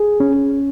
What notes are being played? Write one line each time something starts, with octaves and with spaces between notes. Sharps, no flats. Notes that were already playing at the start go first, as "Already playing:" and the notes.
Already playing: G#4
C#4